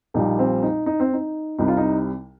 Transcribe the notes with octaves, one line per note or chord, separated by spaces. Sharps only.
A#1 A#2 G3 D#4
C4
D#4
D#4
C4
D#4
C2 C3 G3 D#4
F4
D#4